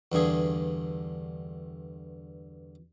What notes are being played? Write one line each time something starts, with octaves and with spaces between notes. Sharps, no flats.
E2 G2 D3 G#4